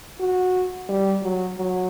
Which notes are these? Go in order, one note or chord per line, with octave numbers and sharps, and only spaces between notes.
F#4
G3
F#3
F#3